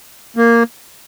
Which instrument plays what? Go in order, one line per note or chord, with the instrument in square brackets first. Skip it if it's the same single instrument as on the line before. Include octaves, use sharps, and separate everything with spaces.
[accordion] A#3